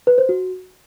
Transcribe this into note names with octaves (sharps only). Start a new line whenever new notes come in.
B4
C5
F#4